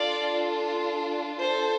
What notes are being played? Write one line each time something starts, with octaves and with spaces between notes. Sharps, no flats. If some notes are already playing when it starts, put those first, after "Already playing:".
Already playing: D4 F4 A4 D5 F5
A4 C5